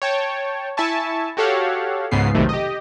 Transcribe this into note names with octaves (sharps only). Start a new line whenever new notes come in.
C#5 G5 A5
E4 E5 G#5 A5 C#6
F#4 G4 A4 C#5 F5 F#5
C#2 G#2 C#3 B3 C7
B1 F2 C3 D#3 A3
G4 D#5